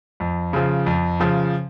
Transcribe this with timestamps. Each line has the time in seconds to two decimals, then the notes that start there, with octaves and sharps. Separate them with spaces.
0.20 F2
0.53 C#3 F3
0.86 F2
1.20 C#3 F3